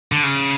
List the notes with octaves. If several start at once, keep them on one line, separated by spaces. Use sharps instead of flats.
D3
C#3